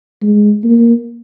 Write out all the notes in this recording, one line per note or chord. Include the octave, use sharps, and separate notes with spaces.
G#3
A#3